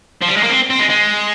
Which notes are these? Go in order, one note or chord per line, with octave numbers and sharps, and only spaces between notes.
F3
G3
G#3
A#3
C4
C4
G#3
G#3